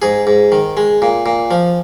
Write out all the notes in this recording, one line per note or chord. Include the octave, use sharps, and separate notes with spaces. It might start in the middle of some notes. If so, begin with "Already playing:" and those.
G#2 G#4
G#2
D#3
G#3
A#2
A#2
F3